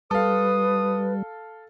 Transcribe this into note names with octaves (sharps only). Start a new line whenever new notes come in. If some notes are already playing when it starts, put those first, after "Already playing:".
G3 A4 B4 F5 D#6